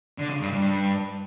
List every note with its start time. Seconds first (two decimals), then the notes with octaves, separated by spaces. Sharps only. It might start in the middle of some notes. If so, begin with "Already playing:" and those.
0.18 D3
0.30 C#3
0.41 G2
0.53 G2